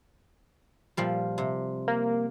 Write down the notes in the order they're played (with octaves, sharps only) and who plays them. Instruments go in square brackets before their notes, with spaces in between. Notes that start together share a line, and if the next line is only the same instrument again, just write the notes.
[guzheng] A#2 F3 G3
C3
[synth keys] A#3